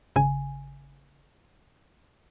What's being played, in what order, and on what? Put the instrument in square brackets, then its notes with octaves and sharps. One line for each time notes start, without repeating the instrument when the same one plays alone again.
[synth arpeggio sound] G#1 C#3 G#5